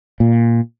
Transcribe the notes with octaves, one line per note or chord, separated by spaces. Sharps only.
A#2